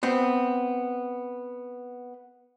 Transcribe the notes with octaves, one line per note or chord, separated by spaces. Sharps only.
B3 C4